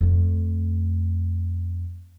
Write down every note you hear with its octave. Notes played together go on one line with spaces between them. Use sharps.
F2 A3